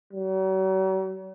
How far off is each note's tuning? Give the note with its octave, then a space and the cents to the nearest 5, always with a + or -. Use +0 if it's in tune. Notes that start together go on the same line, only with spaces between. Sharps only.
F#3 +45